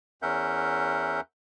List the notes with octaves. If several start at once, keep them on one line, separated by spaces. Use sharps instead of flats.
E2 C#4 A#4 E5 F#5 G6